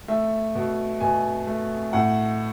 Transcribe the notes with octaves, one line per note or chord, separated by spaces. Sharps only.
A3 E5
B2
B2 G#5
A3
A2 F#5